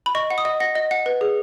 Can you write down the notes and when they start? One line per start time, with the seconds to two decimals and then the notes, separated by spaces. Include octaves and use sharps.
0.06 B5
0.15 D#5 C#6
0.30 F#5
0.38 D#6
0.45 D#5
0.60 F#5 A#6
0.75 D#5
0.91 F#5
1.06 B4
1.21 G#4